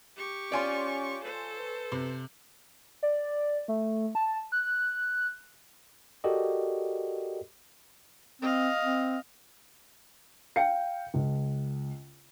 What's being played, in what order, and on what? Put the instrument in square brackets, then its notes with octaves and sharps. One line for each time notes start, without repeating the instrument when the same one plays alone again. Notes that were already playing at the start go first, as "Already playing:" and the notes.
[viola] G4 C#6
[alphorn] C#4 [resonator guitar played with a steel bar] F4 D5 [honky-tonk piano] C#5 G#5 C6
[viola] A4 C5
[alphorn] B4
[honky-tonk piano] C3
[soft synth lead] D5
A3
A5
F#6
[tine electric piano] F#4 G4 A4 A#4 D5 D#5
[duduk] C4 [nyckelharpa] D#5 F5
[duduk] C4
[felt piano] F5 G5 C#7
C#2